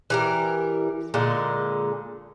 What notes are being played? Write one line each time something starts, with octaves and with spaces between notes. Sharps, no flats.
E3 G3 A#4
A#2 D3 G#3